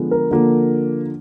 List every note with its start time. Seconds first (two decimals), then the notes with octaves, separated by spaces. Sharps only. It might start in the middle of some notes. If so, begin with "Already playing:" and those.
Already playing: D3 F3 G#3 B3
0.11 A#4
0.31 D3 F3 A#3